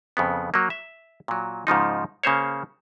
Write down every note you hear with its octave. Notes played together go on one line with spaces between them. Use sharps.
F2 C#3 B3
F#3 A#3
E5
A#2 F#3
G#2 C#3 F3 D#4
C#3 A#3 C5 C#5